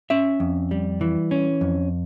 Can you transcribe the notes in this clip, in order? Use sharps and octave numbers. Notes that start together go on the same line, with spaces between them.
C#4 E5
F2
G3
E3
C#4
F2